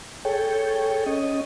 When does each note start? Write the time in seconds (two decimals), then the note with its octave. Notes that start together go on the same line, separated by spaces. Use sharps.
0.25 G#4 A4 C#5 G5
1.06 C#4 D#5